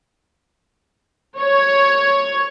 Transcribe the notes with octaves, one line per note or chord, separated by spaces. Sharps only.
C#5